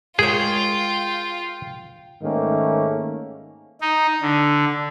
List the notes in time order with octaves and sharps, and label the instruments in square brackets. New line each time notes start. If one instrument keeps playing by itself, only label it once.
[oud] G#3 A#4 C#5 [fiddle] F4 [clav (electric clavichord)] G#4 [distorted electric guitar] G5
[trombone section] G#2 D#3 A3 A#3 C#4
[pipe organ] D#4
D3